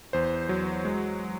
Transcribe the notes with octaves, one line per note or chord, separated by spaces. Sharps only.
E2 C5
F#3
G#3